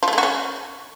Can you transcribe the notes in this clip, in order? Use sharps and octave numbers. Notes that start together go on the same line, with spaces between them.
F3
A3
G#3
F#4
C#4